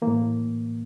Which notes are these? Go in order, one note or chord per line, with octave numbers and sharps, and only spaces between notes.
E3 A#3
A2